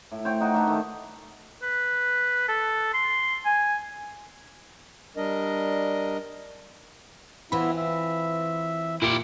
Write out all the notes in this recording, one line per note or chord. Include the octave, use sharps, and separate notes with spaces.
A2
C5 C#5 G5
D#4 F#4
A3 D4 A4 B4
D#3
B4
A4
C6
G#5
G3 D4 A#4 D#5
E3 B3 C4 E4 F4 E5 B5
E5
A#2 E4 G4 C#7 G7